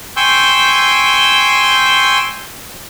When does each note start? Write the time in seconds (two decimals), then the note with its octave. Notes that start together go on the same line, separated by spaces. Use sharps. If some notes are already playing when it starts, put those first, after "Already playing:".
0.17 G5 G#5 C6 C#6 E6 G6